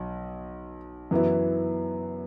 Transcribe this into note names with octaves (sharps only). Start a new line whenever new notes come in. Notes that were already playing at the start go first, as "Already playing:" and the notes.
Already playing: B1
F#2 E3 B3 E4